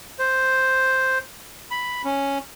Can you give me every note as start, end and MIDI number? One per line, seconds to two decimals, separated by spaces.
0.19 1.18 72
1.71 2.02 83
2.05 2.38 61